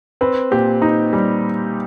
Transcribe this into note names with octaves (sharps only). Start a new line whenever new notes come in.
C4 B4
A#2 G4
D#4
G3